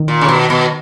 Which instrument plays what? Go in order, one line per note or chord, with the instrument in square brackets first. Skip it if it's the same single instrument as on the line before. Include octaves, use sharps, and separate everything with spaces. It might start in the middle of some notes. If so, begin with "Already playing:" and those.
Already playing: [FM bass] D#3
[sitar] A#2
C#3
B2
B2